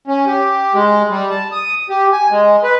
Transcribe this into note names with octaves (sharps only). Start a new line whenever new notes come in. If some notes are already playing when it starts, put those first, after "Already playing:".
C#4
G4
G#3
G3
A5
D#6
G4
G#5
G#3
B4